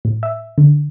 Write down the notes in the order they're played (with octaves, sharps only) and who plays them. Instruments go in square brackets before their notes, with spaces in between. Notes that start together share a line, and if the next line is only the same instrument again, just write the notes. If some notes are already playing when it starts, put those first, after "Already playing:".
[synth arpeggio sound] A2
E5
D3